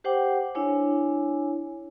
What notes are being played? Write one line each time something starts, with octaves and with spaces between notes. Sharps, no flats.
G4 C5 F#5 G5 D6
D4 E4 C#5 G#5